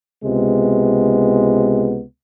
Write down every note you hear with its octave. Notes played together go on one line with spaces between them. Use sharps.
C#2 C3 G#3 B3